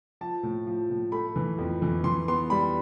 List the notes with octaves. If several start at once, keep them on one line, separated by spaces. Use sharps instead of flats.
F3 A5
A2
F3
A2
A3 B5
E3
F2
E3
E3 C6
B3 C6
G3 B5